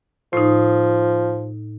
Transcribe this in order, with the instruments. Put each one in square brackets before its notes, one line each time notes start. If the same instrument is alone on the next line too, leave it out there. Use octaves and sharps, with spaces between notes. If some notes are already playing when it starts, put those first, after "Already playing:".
[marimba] A2 D#4 [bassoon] F3